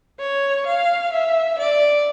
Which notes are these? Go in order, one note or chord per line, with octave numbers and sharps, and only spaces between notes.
C#5
F5
E5
D5